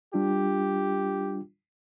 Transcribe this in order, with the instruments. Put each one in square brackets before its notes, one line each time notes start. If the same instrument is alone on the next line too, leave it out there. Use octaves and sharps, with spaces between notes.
[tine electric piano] G3 D4 F4 [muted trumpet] G4